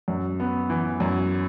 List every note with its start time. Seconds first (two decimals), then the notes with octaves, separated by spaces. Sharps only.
0.08 F#2
0.40 B3
0.70 E3
1.00 F#2